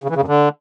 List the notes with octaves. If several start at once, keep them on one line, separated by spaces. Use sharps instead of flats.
C#3
E3
C#3
F#2
D3